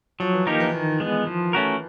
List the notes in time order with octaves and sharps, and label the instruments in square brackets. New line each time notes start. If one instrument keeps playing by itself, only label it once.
[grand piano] F3 [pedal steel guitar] F#3
[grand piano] E3
[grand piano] D#3 [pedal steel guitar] A#3 D#4 G4 A#4
[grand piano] E3
[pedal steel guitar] D#3
G#3 B3
F3
A3 C#4 F#4 A#4